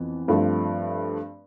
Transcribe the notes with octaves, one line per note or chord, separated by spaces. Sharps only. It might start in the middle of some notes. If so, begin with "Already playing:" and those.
Already playing: F2 E3 B3
G2 F3 A3 C4